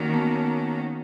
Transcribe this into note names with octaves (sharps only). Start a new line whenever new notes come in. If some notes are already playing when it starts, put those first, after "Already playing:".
Already playing: D#3 A#3 C#4 F#4
B3
B3